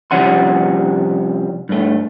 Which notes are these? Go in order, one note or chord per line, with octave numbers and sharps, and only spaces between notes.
C2 F3 G3 C#4 F#5 C6
G2 A3